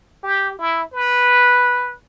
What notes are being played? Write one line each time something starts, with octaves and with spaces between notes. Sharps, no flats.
G4
E4
B4